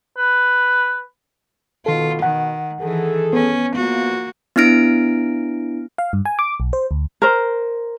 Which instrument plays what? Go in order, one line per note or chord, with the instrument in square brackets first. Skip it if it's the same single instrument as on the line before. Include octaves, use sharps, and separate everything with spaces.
[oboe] B4
[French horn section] B2 [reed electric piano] D#3 A4 [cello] F4
[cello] D#3 [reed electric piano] F#5
[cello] D#3 E3 [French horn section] G#4 A4
[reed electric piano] B3 [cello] C#4
[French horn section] E2 F3 F4 [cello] A#3 F#4
[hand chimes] B3 D4 E4 F6 A#6 D7
[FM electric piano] F5
G2
G#5
D6
B1
C5
D2
[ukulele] A#4 C5